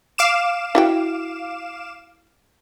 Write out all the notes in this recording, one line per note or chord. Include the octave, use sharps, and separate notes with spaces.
F5 D6 E7
E4 F#4 G5